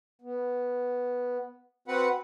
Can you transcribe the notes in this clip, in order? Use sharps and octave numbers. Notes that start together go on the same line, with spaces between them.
B3
C4 F#4 B4 F#5